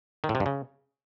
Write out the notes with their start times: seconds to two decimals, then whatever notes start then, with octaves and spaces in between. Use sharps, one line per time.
0.24 D#3
0.29 A2
0.35 C3
0.40 G2
0.46 C#3